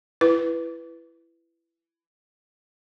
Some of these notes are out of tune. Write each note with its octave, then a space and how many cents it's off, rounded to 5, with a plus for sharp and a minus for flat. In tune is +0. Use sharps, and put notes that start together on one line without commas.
E4 +20 B4 +0